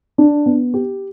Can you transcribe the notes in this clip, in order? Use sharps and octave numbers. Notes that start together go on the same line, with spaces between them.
D4
B3
G4